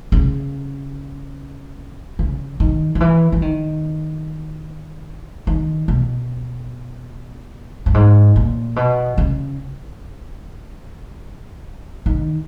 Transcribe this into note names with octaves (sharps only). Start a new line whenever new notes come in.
C#3
C#3
D#3
D#3
E3
E3
D#3
D#3
B2
G2
G#2
A#2
B2
C#3
D#3